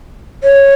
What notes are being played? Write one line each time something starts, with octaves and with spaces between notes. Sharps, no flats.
C#5